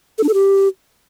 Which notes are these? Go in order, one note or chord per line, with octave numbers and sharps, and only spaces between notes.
A4
D4
A4
G4